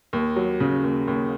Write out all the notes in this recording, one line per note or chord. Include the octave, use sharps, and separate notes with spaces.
D#2
F#3
C#3
D#2
D#2